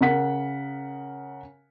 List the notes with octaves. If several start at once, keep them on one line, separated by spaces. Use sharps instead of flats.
C#3 A#4 F#5 B6